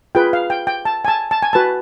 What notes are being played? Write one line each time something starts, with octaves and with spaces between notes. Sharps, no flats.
F4 G#4 B4 G5
F5
G5
G5
A5
G#5
A5
A5
G#5
F#4 B4 A5